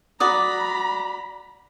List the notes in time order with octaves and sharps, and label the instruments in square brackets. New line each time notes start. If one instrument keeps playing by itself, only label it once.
[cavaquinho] F#4 D5 D#6 [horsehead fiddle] A#5 B5